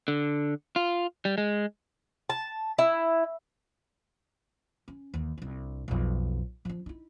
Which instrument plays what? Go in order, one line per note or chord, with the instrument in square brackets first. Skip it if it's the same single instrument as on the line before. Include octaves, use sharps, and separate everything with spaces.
[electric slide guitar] D3
F4
G3
G#3
[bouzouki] A5
E4
[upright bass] C#4
D#2 E3
C2 D4
B1 F2
F3 D4
D#4 E4